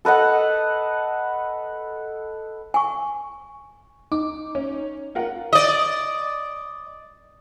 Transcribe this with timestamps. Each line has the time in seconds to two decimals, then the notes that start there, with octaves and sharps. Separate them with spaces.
0.05 A4 B4 D#5 F#5
2.74 G#5 C#6
4.12 D#4 D6
4.55 C#4
5.15 F4 A#4 F#5
5.53 D5 D#5